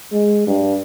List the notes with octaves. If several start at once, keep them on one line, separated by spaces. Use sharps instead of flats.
G#3
G2